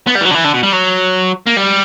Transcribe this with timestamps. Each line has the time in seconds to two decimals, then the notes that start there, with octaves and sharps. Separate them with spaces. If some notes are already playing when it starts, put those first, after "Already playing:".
0.07 B3
0.16 G3
0.21 E3
0.26 F#3
0.31 D3
0.34 E3
0.44 D3
0.54 B2
0.63 G3
0.72 F#3
1.46 A#3
1.57 G3